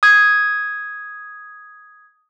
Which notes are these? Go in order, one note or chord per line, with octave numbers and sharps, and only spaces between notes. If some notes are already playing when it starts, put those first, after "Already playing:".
D#6 G#6